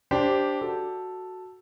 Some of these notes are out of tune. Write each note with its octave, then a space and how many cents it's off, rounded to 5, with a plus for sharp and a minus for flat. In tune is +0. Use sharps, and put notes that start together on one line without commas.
D4 -10 G4 +0 C5 +0
F#4 +0 A4 +0